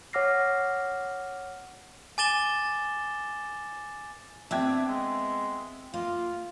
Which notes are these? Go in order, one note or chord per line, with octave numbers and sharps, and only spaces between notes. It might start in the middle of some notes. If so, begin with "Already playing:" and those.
C#5 F#5 D6 F6 A#6 C7
G#5 D6 A6 E7 G7
B3 C4 D4 E5 G5 G#6
G#3
A#3 F4